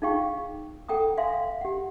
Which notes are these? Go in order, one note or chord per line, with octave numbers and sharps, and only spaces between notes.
D#4 F4 G#4 F5 G5 C#6
A4 F#5 G5 A#5 D#6
E5 F5 G#5 C6
G4 F#5